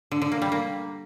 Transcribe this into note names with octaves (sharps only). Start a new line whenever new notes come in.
D3
D3
A#3
G3
A#3